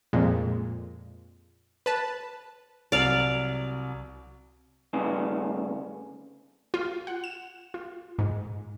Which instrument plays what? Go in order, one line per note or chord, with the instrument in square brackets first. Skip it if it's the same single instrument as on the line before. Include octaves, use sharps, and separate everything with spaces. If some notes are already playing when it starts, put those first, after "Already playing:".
[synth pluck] F2 A#2 G#3
B4 A5
[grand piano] C2 F#3 [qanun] D5 F5
[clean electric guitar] D2 G2 C#3
[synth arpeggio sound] F4
F#5
E7
F4
G#2